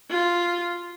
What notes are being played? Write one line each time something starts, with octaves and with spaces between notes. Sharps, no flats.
F4